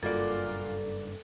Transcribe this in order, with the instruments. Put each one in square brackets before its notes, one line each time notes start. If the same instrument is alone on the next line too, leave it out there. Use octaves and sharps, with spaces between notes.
[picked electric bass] F#1 G2 [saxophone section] A#2 F4 [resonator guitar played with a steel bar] A#3 F#4 D5 [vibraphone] A4